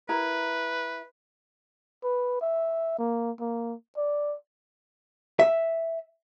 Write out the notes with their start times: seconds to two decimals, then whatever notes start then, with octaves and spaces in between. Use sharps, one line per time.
0.09 E4 A#4 B4 A#5
2.04 B4
2.42 E5
2.99 A#3
3.40 A#3
3.97 D5
5.39 E5